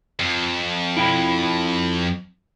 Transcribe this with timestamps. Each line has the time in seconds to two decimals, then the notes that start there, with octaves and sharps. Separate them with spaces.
0.19 F2
0.97 E4 G5 B5